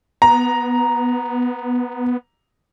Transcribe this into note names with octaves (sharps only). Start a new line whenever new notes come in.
B3 A#5